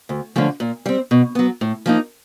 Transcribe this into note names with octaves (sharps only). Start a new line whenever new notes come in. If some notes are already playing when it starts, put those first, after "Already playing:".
D2
D3 F3 A3 C#4
A#2
G3 C4
B2
F#3 B3
A2
F3 A#3 D#4